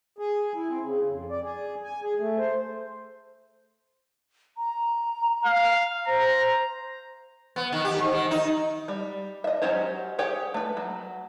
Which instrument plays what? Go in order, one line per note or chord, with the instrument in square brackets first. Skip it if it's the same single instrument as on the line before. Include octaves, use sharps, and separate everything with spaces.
[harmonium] G#4
E4
C4
C#3
F2
D5
G#4
G#5
G#4
A3
C5
[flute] A#5
[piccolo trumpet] F5
[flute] C5 [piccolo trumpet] A#5
[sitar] B3
D#3
G4
G#2
D#3
D#4
[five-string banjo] G3
D#5 E5
F#3 C#4 G4 C5 C#5
G4 G#4 C#5 G5
A3 B4
F#3